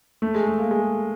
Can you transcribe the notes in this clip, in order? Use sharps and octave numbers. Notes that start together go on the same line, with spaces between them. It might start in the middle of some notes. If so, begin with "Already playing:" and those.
A3
G#3
A3
A#3
G#3